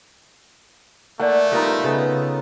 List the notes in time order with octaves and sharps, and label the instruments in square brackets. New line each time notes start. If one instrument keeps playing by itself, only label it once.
[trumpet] A3 [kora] A#3 [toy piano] D5 G#5 [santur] F#5
[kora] G3 B3 A#4 [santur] D#4 F4 D#5
[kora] C#3 A4 [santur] B3